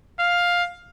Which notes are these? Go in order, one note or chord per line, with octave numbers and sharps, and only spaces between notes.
F5